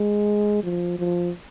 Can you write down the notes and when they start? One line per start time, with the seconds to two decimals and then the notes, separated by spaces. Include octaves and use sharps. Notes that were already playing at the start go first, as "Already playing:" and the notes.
Already playing: G#3
0.63 F3
0.99 F3